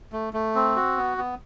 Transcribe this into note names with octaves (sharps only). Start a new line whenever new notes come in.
A3
A3
C4
F#4
B3
B3